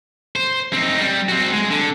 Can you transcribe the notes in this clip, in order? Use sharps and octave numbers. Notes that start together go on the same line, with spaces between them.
C5
C4 D#4
G3
C4 F#4
G#3
D3